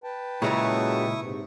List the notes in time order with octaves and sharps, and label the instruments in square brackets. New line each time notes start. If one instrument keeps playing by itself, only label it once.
[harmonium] B4 G5 A5
[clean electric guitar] A#2 G#3 [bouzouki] C#3 F#3 A3 [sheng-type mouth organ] E4 C#6 D#6
[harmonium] G#2 C3